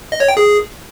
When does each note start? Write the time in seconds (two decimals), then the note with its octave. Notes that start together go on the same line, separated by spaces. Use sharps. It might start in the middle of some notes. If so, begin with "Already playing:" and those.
0.12 D#5
0.20 C#5
0.28 G5
0.37 G#4